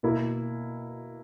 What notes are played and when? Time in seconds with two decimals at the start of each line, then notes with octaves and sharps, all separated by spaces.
0.03 B2 A#3 E4